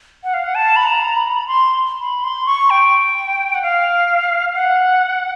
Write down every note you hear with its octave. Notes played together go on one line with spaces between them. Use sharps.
F#5
F5
F#5
A5
B5
A#5
B5
C6
B5
C6
C#6
G5
F#5
F5
F#5